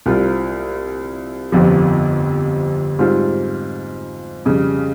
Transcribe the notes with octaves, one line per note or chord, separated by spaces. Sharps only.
C2 C3 G3 C4 F4
G1 F2 C3 F3
G#2 G3 C4 F4
F2 C#3 G3